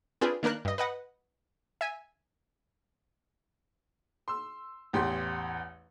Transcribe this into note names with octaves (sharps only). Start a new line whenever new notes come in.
C4 D4 F4 G#4 B4
D#3 A#3 D4 A#4 F#6
G2 D#5
B4 D#5 F#5
E5 G#5
C6 E6
A1 E2 G4 C6